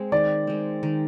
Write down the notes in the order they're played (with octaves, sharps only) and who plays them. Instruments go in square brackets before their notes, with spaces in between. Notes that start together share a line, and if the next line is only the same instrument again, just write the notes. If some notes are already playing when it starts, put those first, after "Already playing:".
Already playing: [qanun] G#3 C4
[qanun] D#3 [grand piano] D5
[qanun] G#3 C4
D#3